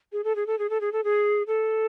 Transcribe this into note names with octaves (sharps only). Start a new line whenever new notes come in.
G#4
A4
G#4
A4
G#4
A4
G#4
A4
G#4
A4